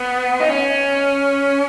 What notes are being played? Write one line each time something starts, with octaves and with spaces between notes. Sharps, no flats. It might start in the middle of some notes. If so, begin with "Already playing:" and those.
Already playing: B3
D#4
C#4